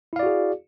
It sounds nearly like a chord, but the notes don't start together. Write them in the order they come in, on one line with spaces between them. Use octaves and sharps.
E4 F5 D5 F#4 G#4